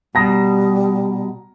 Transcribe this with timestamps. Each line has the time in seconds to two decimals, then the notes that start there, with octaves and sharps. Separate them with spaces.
0.15 B2 G3 A#5 A#6